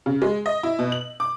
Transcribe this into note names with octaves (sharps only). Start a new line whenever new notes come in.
C#3
G#3
D#5
E4
B2
F#7
D6